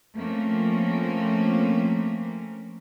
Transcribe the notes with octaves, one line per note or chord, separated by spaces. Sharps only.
F3 A3 A#3 C4 C#4